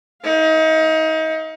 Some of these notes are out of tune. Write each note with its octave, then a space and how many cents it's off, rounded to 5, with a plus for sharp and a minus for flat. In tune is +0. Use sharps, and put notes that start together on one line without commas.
D#4 +30 F5 +0